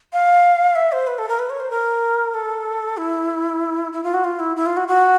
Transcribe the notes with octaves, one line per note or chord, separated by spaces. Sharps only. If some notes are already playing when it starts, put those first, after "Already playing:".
F5
E5
C5
B4
A4
A#4
B4
C#5
C5
A#4
A4
E4
E4
F4
F#4
F4
E4
E4
F4
F#4
F#4